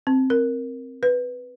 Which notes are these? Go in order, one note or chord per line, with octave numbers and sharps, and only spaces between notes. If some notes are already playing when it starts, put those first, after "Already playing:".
C4
A#4
B4